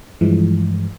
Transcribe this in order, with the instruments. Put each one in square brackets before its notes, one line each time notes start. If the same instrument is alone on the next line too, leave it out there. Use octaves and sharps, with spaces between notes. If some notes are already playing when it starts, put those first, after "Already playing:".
[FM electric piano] G2 E3 F3 G#3